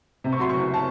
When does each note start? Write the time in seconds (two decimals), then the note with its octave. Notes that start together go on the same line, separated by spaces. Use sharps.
0.24 C3
0.33 C#6
0.39 F#3 C6
0.49 F#1 C#6
0.74 A5